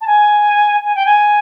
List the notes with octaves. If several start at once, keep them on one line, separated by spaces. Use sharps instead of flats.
A5
G#5
G#5
G5
G#5